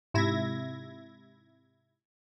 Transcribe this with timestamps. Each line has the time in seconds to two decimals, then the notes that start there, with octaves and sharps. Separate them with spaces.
0.14 G#2 C3 E4 E5 G#6 A#6